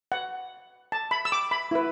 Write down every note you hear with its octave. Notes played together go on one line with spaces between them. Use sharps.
F#5
A5
B5
E6
D6
B5
E4 B4